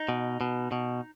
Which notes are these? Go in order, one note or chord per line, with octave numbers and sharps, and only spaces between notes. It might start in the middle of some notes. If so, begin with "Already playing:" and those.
Already playing: D#4
B2
B2
B2